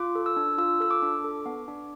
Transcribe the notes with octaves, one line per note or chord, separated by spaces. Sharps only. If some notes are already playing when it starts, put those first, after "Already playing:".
Already playing: F4 D6
A4
E6
D4
F4 E6
A4 E6
D6
D4
A4
B3
D4